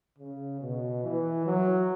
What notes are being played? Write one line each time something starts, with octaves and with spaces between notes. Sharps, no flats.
C#3
B2
E3
F#3